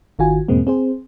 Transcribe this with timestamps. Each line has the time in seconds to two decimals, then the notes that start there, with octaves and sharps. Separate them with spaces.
0.19 G#1 D#3 F4 F#4 G#5
0.48 E2 G#2 B2 G#3 A#3 C4
0.67 C4 G#4 C5